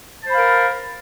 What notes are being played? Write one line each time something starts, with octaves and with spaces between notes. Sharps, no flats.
A#4 C5 F5 A5 B5